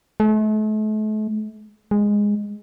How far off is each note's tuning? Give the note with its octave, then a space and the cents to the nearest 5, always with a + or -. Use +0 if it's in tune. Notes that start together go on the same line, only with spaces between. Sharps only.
A3 -40
G#3 -10